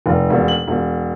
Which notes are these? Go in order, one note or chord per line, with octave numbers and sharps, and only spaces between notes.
F1
E1
F#7
E1